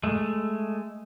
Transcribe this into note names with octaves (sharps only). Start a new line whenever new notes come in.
G#3 A3